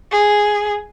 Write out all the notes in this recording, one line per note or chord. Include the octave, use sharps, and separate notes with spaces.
G#4